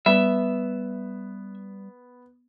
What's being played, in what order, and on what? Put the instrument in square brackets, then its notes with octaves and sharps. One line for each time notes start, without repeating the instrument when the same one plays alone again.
[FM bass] G3 [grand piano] B3 [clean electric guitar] E5